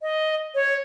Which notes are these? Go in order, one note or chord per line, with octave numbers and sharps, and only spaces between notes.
D#5
C#5